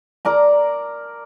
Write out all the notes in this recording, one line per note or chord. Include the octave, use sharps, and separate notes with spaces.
A#4 D5 A#5